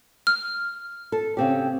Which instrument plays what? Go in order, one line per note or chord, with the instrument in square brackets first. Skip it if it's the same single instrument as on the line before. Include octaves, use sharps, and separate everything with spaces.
[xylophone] F6
[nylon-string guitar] A4
C#3 C4 G4